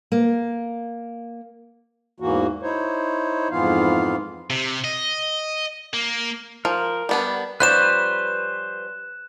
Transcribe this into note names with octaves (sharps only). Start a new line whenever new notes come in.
A#3
E2 G#2 E3 A#3 F#4
D#4 E4 C5 C#5
F2 G#2 E3 B3 F4 F5
C3
D#5
A#3
F3 A#4
G3 B3 D4
F3 G3 C#4 B4 C5 F#6 E7